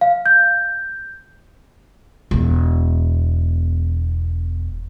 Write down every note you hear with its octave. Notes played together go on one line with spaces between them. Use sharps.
F5
G6
E1 E2